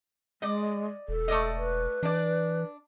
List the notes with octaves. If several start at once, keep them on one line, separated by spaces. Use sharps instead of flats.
G#3 D5 D#5
E1 A4
A3 D5 D#5
B4
E3 D4 D5